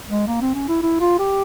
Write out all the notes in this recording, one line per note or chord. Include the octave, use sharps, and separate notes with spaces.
G#3
A#3
C4
C#4
E4
E4
F4
G4